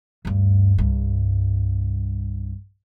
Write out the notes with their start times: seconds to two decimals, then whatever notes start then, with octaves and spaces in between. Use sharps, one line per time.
0.25 D2 G2
0.78 C2 G2